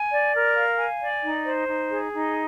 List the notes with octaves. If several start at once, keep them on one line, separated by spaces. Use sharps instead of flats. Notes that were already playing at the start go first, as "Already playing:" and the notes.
Already playing: G#5
D5
A#4
F5
G#5
D5
D#4
C5
D#4
G#4
D#4